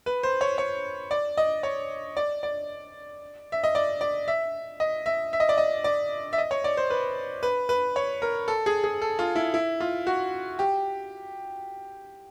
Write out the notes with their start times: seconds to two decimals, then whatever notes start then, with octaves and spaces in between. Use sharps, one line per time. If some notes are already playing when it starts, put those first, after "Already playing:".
0.06 B4
0.23 C5
0.41 C#5
0.58 C#5
1.11 D5
1.37 D#5
1.63 C#5
2.17 D5
2.43 D5
3.52 E5
3.64 D#5
3.75 D5
4.01 D5
4.28 E5
4.80 D#5
5.06 E5
5.33 E5
5.40 D#5
5.49 D5
5.58 D#5
5.84 D5
6.33 E5
6.38 D#5
6.51 C#5
6.64 D5
6.77 C5
6.90 B4
7.43 B4
7.69 B4
7.96 C#5
8.22 A#4
8.48 A4
8.66 G#4
8.84 G#4
9.02 A4
9.19 F4
9.35 E4
9.54 E4
9.80 F4
10.07 F#4
10.59 G4